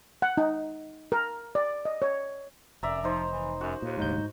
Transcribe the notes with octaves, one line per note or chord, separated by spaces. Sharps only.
F#5
D#4
A#4
D5
D#5
C#5
F1 F#2 D5 E5 A#5
F3 D#4 C5
E3
F#2 F#4
D#2 A#2
F1 D2 G#2 D#4 G6